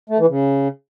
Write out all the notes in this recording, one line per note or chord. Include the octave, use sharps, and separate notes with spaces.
A3
E3
C#3